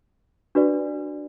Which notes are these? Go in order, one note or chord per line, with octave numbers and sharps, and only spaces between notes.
D4 F#4 B4 D5